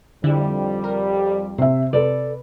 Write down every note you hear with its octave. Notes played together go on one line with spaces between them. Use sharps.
F2 D3 G3 E4
A#4
C3 C5 E5
C3 A4 B4 D5